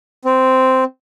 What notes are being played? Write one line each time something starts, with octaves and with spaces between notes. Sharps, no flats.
C4